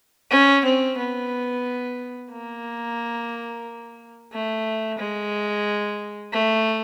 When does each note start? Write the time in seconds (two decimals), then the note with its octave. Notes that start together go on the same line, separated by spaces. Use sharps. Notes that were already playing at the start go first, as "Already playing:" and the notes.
0.31 C#4
0.65 C4
0.98 B3
2.31 A#3
4.32 A3
4.99 G#3
6.32 A3